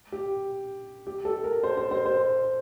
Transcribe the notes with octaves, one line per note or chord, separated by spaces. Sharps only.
G4
G4
A4
A#4
C5
C5
C5
C5